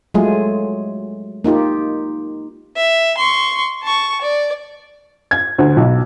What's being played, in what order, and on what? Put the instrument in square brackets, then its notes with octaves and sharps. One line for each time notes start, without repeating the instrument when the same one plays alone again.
[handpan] F#3 G#3 A3 F4 G#4
A#3 D#4 F4 G4
[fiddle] E5
C6 C#6
A5 C#6
D5
[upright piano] G#6
D2
B1